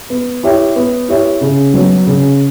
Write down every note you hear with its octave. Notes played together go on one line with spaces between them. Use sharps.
B3
E4 G4 C#5 E5
B3
E4 G4 C#5 E5
C#3
F#3 B3
C#3